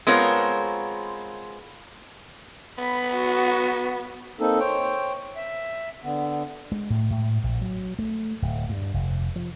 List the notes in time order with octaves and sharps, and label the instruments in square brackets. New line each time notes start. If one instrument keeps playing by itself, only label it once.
[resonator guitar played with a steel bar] G#3 B3 C4 F4 A#4 C#5
[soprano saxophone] B3 [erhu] B5
[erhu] F#4
[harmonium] A#3 C4 D#4 A4
C5 C#5 G5
E5
D3 B3
[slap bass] G#3
A2
A2
A#1
F#3
A3
D1
G2
F1
F3